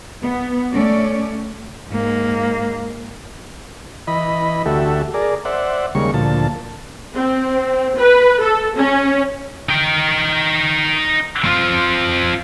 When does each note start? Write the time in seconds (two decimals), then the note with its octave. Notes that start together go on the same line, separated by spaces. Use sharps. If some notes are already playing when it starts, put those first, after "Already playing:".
0.20 B3
0.71 A3 C#4 D5
1.89 G#2 A#3
4.07 E3 D#5 B5
4.66 D2 A3 F#4 G4 A4 E5
5.14 G#4 A#4 D5
5.45 C5 D5 E5 F#5
5.95 D#2 C#3 G3 G#3 A#3 C#6
6.14 D2 A#2 F3 A5
7.15 C4
7.97 B4
8.42 A4
8.77 C#4
9.69 D#4 G5
11.45 C4 F4